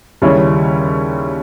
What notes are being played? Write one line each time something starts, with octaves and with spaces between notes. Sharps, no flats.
D#2 C#3 G3 C#4 E4